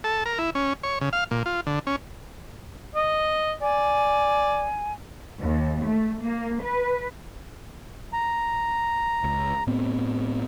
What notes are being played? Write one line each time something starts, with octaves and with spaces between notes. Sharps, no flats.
A4
A#4
E4
C#4
C#5
C#3
F5
A#2
F4
D3
C#4
D#5
D5 G#5
D#2
A3
A#3
B4
A#5
C#2
A2 B3 C4